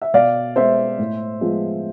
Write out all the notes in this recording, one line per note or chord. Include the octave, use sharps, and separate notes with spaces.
E5
B2 D5 F5
G#3 B3 C5 E5
A2
F3 G#3 B3